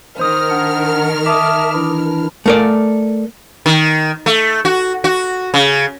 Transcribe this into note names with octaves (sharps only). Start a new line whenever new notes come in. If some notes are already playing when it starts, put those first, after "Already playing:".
D#3 A#4 C5 D#6 F6
D4 F#5
E5 A5 D6 D#6
E3 D4 E4
A3 A#4 D5
D#3
A3
F#4
F#4
C#3